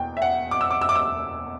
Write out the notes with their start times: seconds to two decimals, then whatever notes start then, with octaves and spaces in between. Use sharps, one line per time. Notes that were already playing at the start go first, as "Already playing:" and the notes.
Already playing: E2 B2 A#3 G5
0.17 E5
0.22 F#5
0.51 D6
0.61 E6
0.71 D6
0.81 E6
0.89 D6
0.95 E6